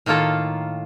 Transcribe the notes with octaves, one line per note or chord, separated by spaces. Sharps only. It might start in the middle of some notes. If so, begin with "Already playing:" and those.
A2 D#3 A#3 F4 A4